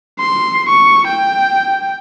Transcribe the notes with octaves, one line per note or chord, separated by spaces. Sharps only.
C6
C#6
G5